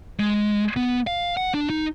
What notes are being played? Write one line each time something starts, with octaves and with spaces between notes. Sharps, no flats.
G#3
B3
F5
F#5
D4
D#4